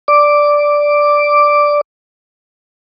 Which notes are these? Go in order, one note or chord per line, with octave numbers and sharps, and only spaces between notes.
D5 D6